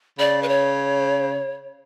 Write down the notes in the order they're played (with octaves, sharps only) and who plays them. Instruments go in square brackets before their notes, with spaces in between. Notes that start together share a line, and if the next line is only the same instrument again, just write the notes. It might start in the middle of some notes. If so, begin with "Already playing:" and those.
[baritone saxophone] C#3 [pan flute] D5
[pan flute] B4
C#5